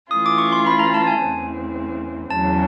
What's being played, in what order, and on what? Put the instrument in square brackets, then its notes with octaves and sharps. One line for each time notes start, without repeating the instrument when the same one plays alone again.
[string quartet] E3 A3 C#4 F4 [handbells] D#6
[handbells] D6
C#6
C6
B5
A#5
A5
G#5
[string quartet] E2 C#3 E3 A3 C4
[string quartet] E2 C#3 F#3 [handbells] A5